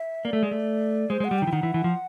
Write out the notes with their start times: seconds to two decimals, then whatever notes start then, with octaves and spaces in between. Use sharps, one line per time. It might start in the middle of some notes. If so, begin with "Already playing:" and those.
Already playing: E5
0.25 A#3 D5
0.33 A3
0.43 G#3
0.51 A3
1.10 G#3 C5
1.20 G#3 F#5
1.31 G3
1.39 D#3 G5
1.47 E3
1.52 D#3 F#5
1.63 E3
1.74 E3
1.84 F3